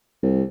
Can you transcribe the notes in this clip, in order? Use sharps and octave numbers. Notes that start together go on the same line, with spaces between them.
C2